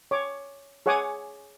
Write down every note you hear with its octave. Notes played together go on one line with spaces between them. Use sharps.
C#5 D6
G#4 C#5 F#5 G#5 D6 D#6